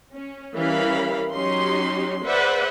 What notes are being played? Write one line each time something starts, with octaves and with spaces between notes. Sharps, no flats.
C#4
E3 G3 C#4 A#4 F5 B5
F#3 C#4 D#4 G4 C6
G#4 B4 C5 D5 E5 F#5